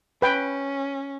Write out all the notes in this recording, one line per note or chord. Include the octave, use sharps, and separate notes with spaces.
C#4 B4 G5